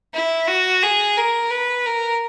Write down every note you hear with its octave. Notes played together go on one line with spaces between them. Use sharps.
E4
F#4
G#4
A#4
B4
A#4